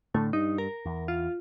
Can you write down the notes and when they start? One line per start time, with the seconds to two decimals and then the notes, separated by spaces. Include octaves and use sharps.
0.14 A2 D3 A3
0.33 G2 D#4
0.58 A#4
0.85 E2
1.08 F4